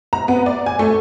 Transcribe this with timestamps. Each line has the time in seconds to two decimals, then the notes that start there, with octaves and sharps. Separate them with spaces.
0.13 A#5
0.28 B3
0.46 D5
0.66 G#5
0.79 A3